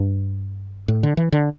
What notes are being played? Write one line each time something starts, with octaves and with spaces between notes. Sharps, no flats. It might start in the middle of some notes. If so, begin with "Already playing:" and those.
Already playing: G2
A2
D3
E3
D3